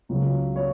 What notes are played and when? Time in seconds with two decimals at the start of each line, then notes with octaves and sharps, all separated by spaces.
0.09 C#2 C#3 F#3
0.56 C#5